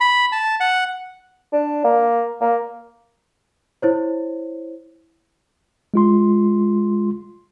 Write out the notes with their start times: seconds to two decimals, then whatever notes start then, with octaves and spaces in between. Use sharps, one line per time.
0.01 B5
0.32 A5
0.60 F#5
1.53 D4
1.84 A#3
2.41 A#3
3.82 E4 C5 C#5
5.94 G#3 F4 C6